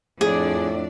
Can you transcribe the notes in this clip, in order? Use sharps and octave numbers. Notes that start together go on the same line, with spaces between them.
F2 A2 D4 G#4 D5